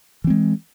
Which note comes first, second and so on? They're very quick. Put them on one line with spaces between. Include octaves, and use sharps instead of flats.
E3 C4 G#3